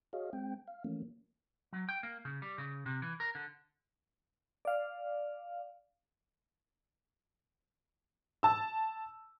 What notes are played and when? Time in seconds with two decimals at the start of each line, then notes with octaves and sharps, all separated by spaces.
0.13 F#4 G#4 C#5 D#5 F5
0.33 G#3 C4 G5
0.68 F5
0.84 E3 F3 A3 A#3 C#4
1.73 F#3
1.89 G5
2.03 A#3
2.25 C#3
2.42 G3
2.58 C#3
2.86 C3
3.02 E3
3.20 A#4
3.35 D3
4.65 D5 F5
8.43 A5 E6